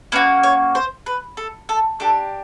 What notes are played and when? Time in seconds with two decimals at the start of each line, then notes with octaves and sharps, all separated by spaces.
0.12 A#3 C#4 F#4 B4
0.43 C#5
0.75 C5
1.06 B4
1.37 A4
1.69 A4
2.00 D4 G4 A4